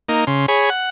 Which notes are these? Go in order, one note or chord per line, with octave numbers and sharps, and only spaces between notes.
A#3 D#4
C#3 C6
G#4 C#5 B5
F#5